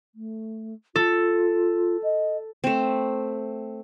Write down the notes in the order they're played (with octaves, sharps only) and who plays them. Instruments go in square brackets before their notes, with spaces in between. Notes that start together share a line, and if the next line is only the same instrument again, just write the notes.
[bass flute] A3
[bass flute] F4 [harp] A4
[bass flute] D#5
[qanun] A3 C4